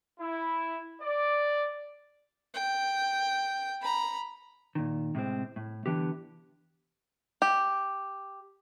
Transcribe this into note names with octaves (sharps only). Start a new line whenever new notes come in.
E4
D5
G5
A#5 B5
A#2 D#3
A2 C3 G#3 C4
A2
C2 B2 D3 E3 B3 G4
G4